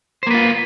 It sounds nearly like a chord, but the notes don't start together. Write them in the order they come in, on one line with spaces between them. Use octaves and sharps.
C5 A#3 B4 F4